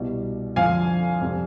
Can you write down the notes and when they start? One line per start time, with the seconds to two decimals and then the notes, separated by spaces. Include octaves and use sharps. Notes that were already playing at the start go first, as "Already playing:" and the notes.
Already playing: C2 B2 G3
0.56 F2 D3 F3 F5 G#5
1.21 F2 C3 G3